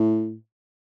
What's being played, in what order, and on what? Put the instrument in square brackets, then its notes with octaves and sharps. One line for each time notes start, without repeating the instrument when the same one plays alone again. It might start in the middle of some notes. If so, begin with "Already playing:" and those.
Already playing: [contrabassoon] A2